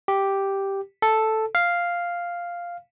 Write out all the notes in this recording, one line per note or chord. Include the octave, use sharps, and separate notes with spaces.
G4
A4
F5